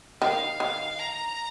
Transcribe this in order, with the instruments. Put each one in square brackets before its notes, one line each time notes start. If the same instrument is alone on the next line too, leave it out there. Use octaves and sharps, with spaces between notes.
[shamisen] D#3 [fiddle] F5
[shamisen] D#3
[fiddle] A#5